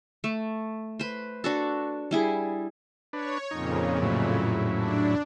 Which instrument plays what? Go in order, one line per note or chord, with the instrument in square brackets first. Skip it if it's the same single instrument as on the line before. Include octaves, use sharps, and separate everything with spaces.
[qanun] A3
B4 C5
D4 F#4 A4
G3 E4 G#4
[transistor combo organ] D4 B4 [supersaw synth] C#5
[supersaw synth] F2 A#2 C#3 [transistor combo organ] D#4
[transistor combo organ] A2 F#3 E4
[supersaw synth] D4